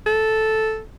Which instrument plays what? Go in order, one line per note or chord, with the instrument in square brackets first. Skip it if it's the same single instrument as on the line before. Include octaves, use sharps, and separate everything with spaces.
[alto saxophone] A4